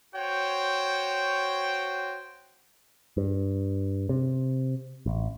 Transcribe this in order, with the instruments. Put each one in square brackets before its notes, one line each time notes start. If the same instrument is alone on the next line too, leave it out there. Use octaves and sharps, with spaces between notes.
[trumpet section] F#4 C5 C#5 G5
[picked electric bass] G2
C3
A1